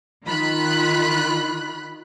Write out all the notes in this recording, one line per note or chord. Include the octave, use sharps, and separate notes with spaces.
D#3 F4 B5 F#6